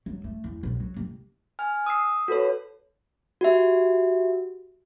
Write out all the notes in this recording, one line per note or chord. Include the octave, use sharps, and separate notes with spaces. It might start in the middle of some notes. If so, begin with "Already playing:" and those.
F#3
A3
E2
B1
F#3
C2
G#5 F6
D#6 E6 C7
F#4 A4 B4 C#5
F#4 G4 E5